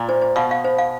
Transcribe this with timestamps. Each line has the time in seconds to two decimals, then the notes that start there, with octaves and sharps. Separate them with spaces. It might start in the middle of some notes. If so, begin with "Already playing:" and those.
Already playing: A#2
0.09 C5
0.22 C5
0.36 B2 F5
0.51 F5
0.65 C5
0.79 F5